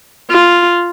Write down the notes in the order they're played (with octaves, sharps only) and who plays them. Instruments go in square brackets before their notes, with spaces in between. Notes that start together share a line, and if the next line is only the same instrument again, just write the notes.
[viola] F4